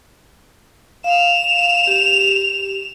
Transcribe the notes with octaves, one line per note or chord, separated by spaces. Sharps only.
F5 E7 F7
G4